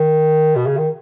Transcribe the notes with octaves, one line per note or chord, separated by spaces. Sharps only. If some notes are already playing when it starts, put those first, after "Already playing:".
Already playing: D#3
B2
C#3
D#3